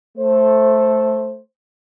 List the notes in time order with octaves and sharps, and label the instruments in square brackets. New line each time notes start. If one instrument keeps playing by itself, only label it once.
[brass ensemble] A3 C5